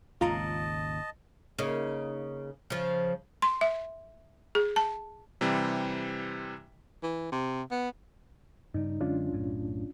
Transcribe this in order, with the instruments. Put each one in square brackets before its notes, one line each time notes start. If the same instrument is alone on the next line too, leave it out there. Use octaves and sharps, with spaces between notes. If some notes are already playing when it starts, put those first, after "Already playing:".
[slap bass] G#1 D#2 C#3 [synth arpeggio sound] F4 A#5 [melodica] D#5 A5
[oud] C#3 A#3 D#4
C#3 F3
[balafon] C6
E5
G#4
A5
[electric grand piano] C3 E3 G3 C4
[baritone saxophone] E3
C3
B3
[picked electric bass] G2 C#3 G3 [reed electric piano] D#4
[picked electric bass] F#2 D3 G#3 [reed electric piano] C#4 D4 F4
[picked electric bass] B1 F#2 A2